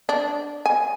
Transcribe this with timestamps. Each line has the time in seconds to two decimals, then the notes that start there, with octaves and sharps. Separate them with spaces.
0.09 D4
0.66 G#5